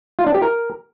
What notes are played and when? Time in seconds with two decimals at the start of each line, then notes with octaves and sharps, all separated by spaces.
0.19 F4
0.27 D4
0.34 G4
0.42 A#4